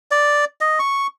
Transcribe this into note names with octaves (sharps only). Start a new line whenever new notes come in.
D5
D#5
C#6